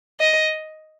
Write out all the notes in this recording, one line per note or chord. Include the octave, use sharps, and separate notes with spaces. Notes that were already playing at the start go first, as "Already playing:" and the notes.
D#5